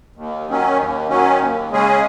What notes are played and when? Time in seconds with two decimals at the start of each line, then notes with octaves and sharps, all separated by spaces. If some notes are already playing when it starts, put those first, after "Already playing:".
0.16 D#2
0.47 D#3 F#3 C#4
0.77 D#2
1.08 D#3 F#3 C#4
1.39 D#2
1.70 C#3 G#3 C#4 G#4